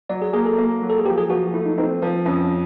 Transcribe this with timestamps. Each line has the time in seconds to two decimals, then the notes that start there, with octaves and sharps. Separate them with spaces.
0.09 F#3 D5
0.22 G#4
0.33 A#3 G#4
0.46 A4
0.58 A#3
0.82 F#3
0.90 A4
0.98 G#4
1.06 F3 G4
1.18 G#4
1.30 F3 F#4
1.54 A3 E4
1.66 D#4
1.78 C4 D#4
2.02 F3
2.25 F2 C#4